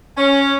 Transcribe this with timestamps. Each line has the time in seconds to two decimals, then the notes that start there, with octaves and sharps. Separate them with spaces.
0.18 C#4